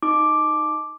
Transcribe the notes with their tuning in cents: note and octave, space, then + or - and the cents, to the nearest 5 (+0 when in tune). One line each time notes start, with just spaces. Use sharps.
D#4 -5 D6 +5